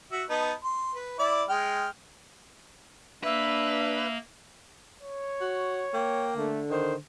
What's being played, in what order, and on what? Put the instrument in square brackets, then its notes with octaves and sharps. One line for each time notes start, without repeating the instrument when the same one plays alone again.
[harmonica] F#4 E5
B3 D#4 A5
C6
B4
E4 D5 D6
G#3 G5 F6
[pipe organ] A#3 [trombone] D4 [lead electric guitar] B4 [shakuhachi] E5
[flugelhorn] C#5
[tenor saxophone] F#4
[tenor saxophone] A#3 [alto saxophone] G5
[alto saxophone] D3 [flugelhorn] A3
[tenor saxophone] D#3 [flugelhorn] C5